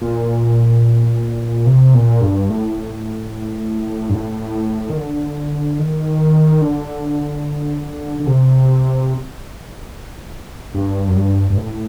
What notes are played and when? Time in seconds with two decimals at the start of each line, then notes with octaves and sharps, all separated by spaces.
0.01 A#2
1.66 C3
1.94 A#2
2.21 G2
2.50 A2
4.09 G2
4.14 A2
4.90 D#3
4.97 D3
5.79 D#3
6.61 D3
8.20 D3
8.27 C3
10.75 G2
11.08 F#2
11.16 G2
11.50 G2
11.57 A2